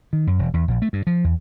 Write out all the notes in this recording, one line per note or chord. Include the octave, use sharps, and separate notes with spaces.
D#3
F#2
E1
E2
A#1
A3
G2
F3
E2